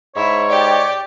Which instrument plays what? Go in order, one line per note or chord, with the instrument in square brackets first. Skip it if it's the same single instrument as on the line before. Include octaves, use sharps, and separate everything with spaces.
[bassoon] G#2 [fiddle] E4 [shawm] C#5
[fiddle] G4 [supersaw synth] D5 G5